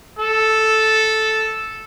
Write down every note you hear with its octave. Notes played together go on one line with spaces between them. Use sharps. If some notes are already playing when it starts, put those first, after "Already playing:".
A4